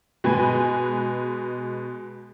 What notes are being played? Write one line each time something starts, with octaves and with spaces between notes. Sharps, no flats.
B2 G#3 B4 G#5